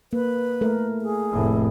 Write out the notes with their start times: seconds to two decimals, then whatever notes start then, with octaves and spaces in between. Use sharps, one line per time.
0.13 A#3 B4
0.61 A3 A#4
1.02 G#4
1.31 F1 A2